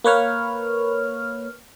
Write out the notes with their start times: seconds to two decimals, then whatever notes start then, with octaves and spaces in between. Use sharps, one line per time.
0.04 A#3 B4 C#5 F6